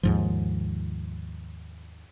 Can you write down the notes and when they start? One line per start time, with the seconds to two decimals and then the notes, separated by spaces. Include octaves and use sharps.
0.03 D#2 G#2 F3